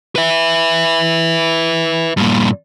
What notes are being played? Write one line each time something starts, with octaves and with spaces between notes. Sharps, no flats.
B4 E5
G2 A#2